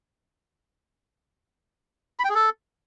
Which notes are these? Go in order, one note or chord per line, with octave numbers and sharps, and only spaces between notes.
B5
G5
G#4
A4